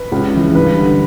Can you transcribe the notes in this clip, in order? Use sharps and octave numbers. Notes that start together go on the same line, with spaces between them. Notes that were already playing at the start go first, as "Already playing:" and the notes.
Already playing: B4
C#2
C#3 E3
G2 B4
D3